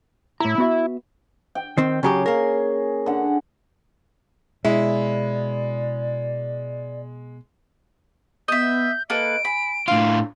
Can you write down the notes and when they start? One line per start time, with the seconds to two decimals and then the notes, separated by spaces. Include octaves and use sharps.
0.40 A2 E4 A#5
0.58 B3 F#4 E5
1.55 G5
1.77 D#3 C4
2.03 C#3 F#3 C#4 G4 G#4
2.26 A#3 A#4
3.06 D3 F#5
4.65 B2 G#3 B3 E4 D5
8.48 B3 D#5 E5 G6
9.10 A#3 A4 B4 D#5 D7
9.45 G#5 B5
9.88 A2 D4 F4 F5